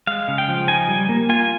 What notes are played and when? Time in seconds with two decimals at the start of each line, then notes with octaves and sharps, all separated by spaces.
0.07 G#3 F5
0.28 C#3
0.38 G5
0.49 F3
0.68 D#4 G#5
0.88 G3
1.09 A#3
1.29 F4 G#5